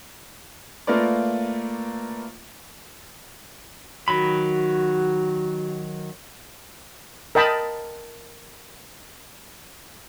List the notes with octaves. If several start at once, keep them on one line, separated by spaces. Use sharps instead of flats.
A3 A#3 F4 A#4 B4 D5
D#3 F#3 F#4 B5
A#4 D#5 G5 A5 B5